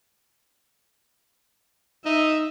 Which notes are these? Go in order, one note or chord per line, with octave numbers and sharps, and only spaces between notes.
D#4 E5